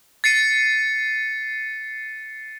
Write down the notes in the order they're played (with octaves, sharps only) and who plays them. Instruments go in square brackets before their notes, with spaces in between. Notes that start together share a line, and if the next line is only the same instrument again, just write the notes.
[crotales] A6 C7 C#7 D#7